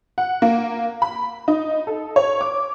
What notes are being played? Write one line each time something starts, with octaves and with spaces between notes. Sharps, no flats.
F#5
A#3
B5
D#4
A4
C#5
D6